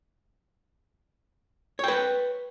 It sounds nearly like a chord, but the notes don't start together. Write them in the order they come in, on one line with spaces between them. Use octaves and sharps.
C#5 G5 B4